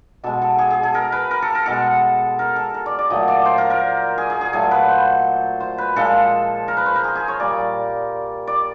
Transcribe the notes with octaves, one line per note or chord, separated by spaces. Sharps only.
B2 G#3 A4
A4
G#4
G#4
A4
A#4
B4
A#4
A4
A#4
B2 G#3 A4
A#4
A4
A#4
D5
D5
A#2 F#3 A3 D#5
D5
C5
A#4
A#4
G#4
G#4
G#4
A#2 F#3 A3 A4
B4
C5
C5
B4
A#2 F3 G#3 A4
A#4
B4
C5
A#4
G#4
G#4
C#5
A#2 G3 D5
D5